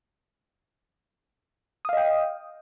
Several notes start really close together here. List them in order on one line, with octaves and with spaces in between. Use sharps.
D#6 F5 D#5 G5